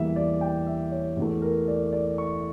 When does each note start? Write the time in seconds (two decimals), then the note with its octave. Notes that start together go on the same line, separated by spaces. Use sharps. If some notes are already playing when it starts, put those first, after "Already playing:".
Already playing: E2 E3 G3 A#3 E5
0.16 D5
0.41 G5
0.66 E5
0.92 C#5
1.17 E2 E3 A3
1.42 A#4
1.68 D5
1.93 D5
2.18 C#6